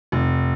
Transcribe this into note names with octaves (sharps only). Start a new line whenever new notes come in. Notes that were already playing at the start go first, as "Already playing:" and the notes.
F1